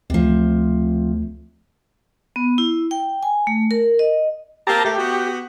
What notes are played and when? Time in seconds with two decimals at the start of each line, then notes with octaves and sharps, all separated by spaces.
0.10 D2 C3 F3 A3
2.36 B3
2.58 E4
2.91 G5
3.23 G#5
3.47 A3
3.71 A#4
3.99 D#5
4.67 A#3 C4 G4 A5 A#5
4.85 A3 G4
4.98 B3 F#4